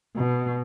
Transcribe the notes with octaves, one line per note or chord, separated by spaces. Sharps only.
B2